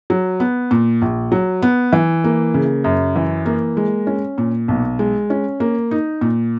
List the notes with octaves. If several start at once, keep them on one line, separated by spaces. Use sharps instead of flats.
F#3
B3
A#2
A#1
F#3
B3
E3
A#3
C#3
F#2
E3
A#3
G#3
C#4
A#2
B1
G#3
C#4
A#3
D#4
A#2